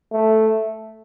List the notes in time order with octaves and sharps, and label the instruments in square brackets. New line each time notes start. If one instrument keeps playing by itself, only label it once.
[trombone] A3